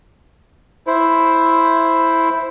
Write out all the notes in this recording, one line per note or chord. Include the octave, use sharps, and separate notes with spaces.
E4 C5